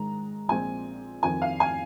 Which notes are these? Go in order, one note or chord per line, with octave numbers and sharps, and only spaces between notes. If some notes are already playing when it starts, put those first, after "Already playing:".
Already playing: G#2 D#3 G#3 A#5
A#1 A#2 G#3 C4 G#5
F2 D#3 C4 G#5
F5
G#5